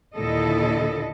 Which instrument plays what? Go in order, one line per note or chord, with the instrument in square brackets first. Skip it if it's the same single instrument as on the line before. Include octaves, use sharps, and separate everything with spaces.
[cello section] D#2 A#2 D3 E4 A4 D#5